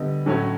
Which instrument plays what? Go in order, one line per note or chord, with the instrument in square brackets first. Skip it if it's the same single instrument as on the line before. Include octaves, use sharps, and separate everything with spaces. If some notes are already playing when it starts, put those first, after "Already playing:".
Already playing: [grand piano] D3 G3 B3 D#5
A2 F#3 A3 C#4